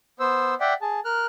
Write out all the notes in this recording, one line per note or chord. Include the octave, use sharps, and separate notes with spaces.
B3 C5 E6
D5 E5 F#5 G5
G#4 A5
A#4 F6 F#6